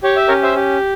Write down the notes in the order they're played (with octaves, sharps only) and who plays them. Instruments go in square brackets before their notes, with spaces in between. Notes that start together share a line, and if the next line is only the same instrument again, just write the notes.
[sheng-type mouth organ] G4 C#5
E5
C#4 A#4 C#5
C5 E5
G4